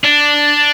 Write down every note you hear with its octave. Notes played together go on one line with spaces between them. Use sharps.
D4